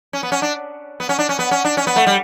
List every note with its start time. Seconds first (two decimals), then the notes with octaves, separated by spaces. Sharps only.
0.13 C#4
0.23 B3
0.32 C#4
0.42 D4
1.00 B3
1.09 C#4
1.19 D4
1.29 C#4
1.39 B3
1.51 C#4
1.65 D4
1.77 C#4
1.87 B3
1.96 A3
2.07 G3